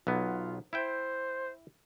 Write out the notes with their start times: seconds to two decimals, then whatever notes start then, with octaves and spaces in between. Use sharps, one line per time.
0.07 B1 F#3 B3 F4
0.73 E4 C5 E5 G5